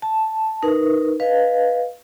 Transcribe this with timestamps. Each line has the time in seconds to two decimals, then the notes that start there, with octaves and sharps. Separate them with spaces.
0.02 A5
0.62 D#4 A#4 B4
1.20 B4 D#5 F5